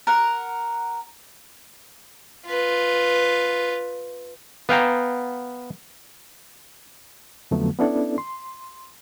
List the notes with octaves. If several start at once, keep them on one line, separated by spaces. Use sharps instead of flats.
A#4 F#5
F4 B4
B3 F5 G5 A#5
F2 D3 F3 F#3 A3 B3
B3 C#4 D4 E4 A4 D5
C6